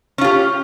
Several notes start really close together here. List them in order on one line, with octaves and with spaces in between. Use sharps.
C#4 F4 G4